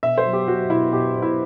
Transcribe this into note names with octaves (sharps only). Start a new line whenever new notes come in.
B2 E5
C5
F#3
G4
F#3 F#4
B2 E4
B2 G4
B2
E4